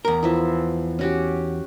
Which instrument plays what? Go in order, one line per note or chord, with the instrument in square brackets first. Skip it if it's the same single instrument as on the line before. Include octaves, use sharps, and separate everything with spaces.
[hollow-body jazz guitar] E2 A#4
[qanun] E3 F3 E5
C#4 F#4 G4